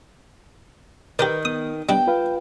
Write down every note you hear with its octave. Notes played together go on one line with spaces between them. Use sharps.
D#3 G4 A#4 B4 D5
B3 D#6
G3 B3 D4 G5
F4 B4 F5